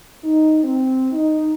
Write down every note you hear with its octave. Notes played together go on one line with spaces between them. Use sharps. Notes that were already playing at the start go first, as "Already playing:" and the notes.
D#4
C4
D#4